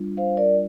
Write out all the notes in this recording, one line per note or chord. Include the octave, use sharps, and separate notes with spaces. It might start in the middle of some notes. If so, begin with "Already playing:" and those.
Already playing: G3 D4 F4
C5 F5
A#4 D5